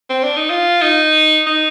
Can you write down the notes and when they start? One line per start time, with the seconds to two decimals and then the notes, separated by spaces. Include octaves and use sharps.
0.10 C4
0.24 D4
0.37 D#4
0.50 F4
0.82 D#4
1.46 D#4